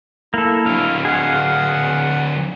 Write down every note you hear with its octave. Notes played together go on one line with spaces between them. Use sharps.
A#3 E4 A4
D3 F#3 F5
G#4 F5 F#5